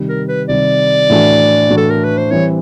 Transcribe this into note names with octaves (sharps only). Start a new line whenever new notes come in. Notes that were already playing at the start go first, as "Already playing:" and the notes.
Already playing: C3 D#3 G3
A#4
B4
C3 D#3 G3 D5
A2 E3 A3 D4 F#4
A2 E3 A3 D4 F#4
A4
A#4
B4
C5
E3 G3 C4 E4 C#5